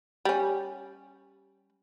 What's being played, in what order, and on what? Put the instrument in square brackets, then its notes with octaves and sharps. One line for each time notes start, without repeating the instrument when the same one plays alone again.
[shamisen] G3 C#4